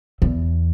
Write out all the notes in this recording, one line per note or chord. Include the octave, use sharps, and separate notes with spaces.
E2